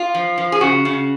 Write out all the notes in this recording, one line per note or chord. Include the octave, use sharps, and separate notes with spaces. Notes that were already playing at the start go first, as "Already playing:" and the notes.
Already playing: F4
F3
F3
G#4
C#3 F#4
C#3